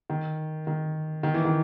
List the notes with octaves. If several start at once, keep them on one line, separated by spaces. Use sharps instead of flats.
D#3
D#3
D#3
E3
D#3